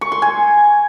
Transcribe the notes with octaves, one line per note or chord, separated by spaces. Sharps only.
C#6
C6
G#5